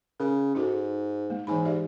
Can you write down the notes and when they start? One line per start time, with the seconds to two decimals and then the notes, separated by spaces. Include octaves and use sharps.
0.20 C#3 A#4
0.55 G#2 D#4 F#4 A4
1.30 G#3 A#3
1.47 G#2 E3 G#5 B5
1.65 G4 D5 E5